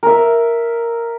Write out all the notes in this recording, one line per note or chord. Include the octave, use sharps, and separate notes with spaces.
A#4 E5